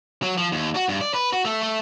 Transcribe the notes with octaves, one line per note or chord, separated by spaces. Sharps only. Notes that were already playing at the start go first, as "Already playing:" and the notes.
F#3
F3
D#2
F#4
G2
D5
B4
F#4
A3
A3